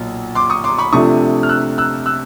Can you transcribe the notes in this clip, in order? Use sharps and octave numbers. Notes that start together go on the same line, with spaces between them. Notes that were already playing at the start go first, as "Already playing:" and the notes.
Already playing: B1 A#2
C6 D6
C#6 D#6
C6 D6
B5 C#6
C3 F3 A3 D4 C#6 D#6
F6
E6 F#6
E6 F#6
E6 F#6